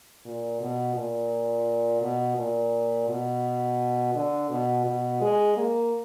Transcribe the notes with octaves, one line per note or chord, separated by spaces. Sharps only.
A#2
B2
A#2
B2
A#2
B2
D3
B2
B2
G#3
A#3